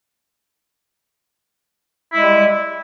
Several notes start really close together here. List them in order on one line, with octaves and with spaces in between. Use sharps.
E4 G#3 G3